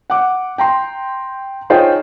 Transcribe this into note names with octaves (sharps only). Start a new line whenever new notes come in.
F#5 D6
G5 A#5 C6
D#4 F4 G#4 C5 C#5 G5